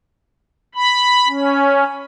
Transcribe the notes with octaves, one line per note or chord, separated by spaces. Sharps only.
B5
C#4